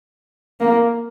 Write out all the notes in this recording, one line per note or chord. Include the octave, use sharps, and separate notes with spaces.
A#3